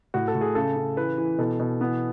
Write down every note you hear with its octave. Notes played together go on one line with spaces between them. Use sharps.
A2 F#4
A4
A2
G#4
C#3 A4
C#3
E3 B4
E3
B2 A4
B2
E3 B3